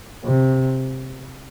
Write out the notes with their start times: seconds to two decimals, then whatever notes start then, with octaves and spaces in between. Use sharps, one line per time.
0.24 C3